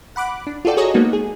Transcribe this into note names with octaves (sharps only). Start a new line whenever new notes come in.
F#5 B5 D6 F#6
D4
F4 F#4 A4 D5 G5
F#4 G#4 A4 C#5 D#5 A#5
G#3 A#3 B3 D#4 F#4
G#4